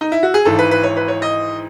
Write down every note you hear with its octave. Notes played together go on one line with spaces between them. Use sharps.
D#4
E4
F#4
G#4
G#1 G#2 E3 A4
B4
B4
C#5
B4
C#5
D#5